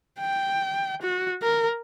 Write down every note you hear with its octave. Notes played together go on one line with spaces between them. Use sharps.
G5
F#4
A#4